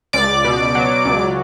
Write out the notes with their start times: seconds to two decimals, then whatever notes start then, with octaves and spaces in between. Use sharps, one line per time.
0.13 C#2 D5 D6
0.44 B2
0.75 F#3
1.05 C#2